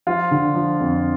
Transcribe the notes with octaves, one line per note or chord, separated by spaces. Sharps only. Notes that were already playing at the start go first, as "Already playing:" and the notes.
F3 F4
D3
F3
F2